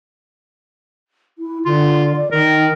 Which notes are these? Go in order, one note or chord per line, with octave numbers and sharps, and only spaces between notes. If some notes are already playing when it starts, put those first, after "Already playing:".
E4
D3 F4
D5
D#3 A#4